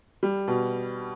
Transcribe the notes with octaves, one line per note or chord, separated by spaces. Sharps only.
G3
B2